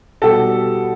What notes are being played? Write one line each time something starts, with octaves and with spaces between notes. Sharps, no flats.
B2 G3 G4 A4